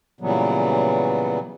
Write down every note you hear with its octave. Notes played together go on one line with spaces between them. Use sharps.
A#2 C#3 E3 F#3 G3 B3